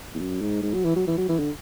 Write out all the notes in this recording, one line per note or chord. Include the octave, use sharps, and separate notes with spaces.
E2
F#2
G#2
G#2
F#3
E3
F#3
E3
F#3
E3
D3